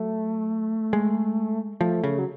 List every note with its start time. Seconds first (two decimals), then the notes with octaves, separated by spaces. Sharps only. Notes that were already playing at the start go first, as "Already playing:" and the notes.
Already playing: F#3 A3
0.93 G#3
1.81 F3 A3
2.04 C#3
2.18 F#3